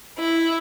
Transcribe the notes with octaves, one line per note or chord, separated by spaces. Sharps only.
E4